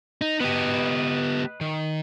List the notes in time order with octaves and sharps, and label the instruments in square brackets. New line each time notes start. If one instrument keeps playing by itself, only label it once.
[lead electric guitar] D#4
[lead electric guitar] B3 G4 [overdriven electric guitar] B4 D#5
[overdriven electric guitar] D#3